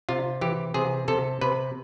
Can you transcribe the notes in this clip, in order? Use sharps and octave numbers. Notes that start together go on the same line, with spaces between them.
C3 F4
E3 G4
C3 G#4
C3 A4
C3 B4